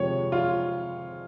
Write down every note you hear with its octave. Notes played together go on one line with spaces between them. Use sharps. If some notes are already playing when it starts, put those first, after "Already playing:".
Already playing: F2 C3 F3 G#3 C#5
F4